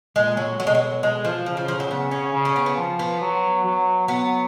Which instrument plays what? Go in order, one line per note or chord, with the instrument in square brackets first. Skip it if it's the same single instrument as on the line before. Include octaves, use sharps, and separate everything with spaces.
[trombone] A#2 [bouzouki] G#3
[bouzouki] F#3
[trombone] B2 [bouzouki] F#3
[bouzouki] G#3
F#3
G#3
F3
[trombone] C#3 [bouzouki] F3
[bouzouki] F3
F3
F#3
[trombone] C#3 [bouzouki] B3
[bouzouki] C#4
[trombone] C#3
[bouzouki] C#4
B3
B3
[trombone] F3
[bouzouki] B3
[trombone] F#3
F#3
[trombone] F#3 [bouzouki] B3